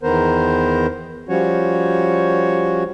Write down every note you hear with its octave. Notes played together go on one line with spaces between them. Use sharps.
E2 D#3 B3 A#4 C5
F3 G3 C#4 F#4 C#5